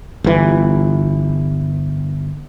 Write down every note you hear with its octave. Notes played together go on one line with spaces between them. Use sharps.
G1 E3